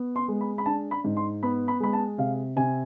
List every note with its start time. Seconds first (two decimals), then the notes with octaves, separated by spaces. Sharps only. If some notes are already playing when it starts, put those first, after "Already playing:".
Already playing: B3
0.16 C6
0.28 G#3
0.41 B5
0.58 B5
0.66 D4 A5
0.91 B5
1.04 G#2
1.17 C6
1.43 B3 B5
1.68 B5
1.80 G#3 B5
1.93 A5
2.18 C3 F5
2.56 C3 G#5